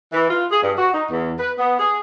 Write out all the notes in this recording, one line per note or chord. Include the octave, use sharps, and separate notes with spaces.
E3
F4
G#4
G2
F#4
D#4
E2
B4
B3
G#4